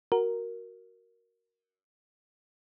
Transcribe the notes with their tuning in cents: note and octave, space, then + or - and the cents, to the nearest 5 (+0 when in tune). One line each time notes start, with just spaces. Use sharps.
F#4 +0 A#4 +0